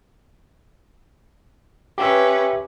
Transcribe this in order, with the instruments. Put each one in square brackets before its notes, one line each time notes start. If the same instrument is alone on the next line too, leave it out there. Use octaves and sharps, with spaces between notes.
[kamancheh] C#4 B4 [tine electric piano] G4 E5